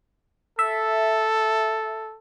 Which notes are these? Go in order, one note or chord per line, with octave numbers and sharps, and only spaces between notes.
A4 E5